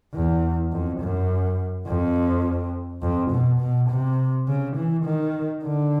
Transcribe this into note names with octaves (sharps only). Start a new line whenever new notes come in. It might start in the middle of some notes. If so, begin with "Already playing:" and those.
E2
F2
F#2
F2
F2
B2
B2
C3
C#3
E3
D#3
D3